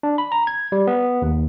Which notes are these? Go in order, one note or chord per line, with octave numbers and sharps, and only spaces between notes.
D4
B5
A#5
G#6
G3
B3
D#2